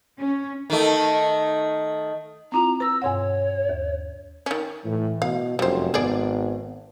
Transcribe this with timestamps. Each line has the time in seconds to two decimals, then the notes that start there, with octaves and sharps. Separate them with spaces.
0.19 C#4
0.70 D#3 A3
2.52 C4 E4 F4 A#5
2.80 B4 A#5 E6 A#6
3.02 G2 B2 C#5 F#5
3.69 D#2
4.46 D#3 C#4
4.85 A2 E3
5.22 B2 F5
5.59 F1 F#2 G3 C5
5.94 G#1 B3 G#4 D5